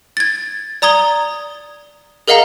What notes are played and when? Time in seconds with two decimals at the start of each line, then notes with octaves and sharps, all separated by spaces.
0.17 G#6 A6
0.82 D5 A#5 D#6 G#6 G7
2.28 G#4 A#4 D#5 F5 F#5 A#5